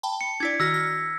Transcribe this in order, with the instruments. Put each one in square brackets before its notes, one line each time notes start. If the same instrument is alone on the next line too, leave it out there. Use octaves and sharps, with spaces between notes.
[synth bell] G5 A5 B5
[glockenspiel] C#7
[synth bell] D4 E4 D5 [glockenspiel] G#6 B6
[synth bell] D#3 F#4 F6 [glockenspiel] E6 A#6
[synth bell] F6